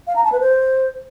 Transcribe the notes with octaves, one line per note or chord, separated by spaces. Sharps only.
F5
A#5
A5
B4
C5